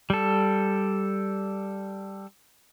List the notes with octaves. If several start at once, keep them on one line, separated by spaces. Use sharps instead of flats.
G3 A4